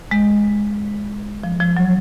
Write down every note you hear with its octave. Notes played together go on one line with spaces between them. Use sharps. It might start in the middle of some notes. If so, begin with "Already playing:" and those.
G#3
F3
F3
F#3